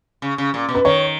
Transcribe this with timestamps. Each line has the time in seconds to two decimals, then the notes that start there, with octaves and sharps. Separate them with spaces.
0.22 C#3
0.38 C#3
0.54 A#2
0.69 B2
0.75 B4
0.85 D#3 C#5